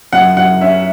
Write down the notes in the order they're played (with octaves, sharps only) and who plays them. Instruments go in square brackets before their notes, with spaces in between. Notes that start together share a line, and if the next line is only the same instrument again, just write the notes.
[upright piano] F#2 F#5
F#2 F#5
C#4 E5